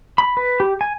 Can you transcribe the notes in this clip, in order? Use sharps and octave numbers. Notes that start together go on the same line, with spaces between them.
B5
B4
G4
G#5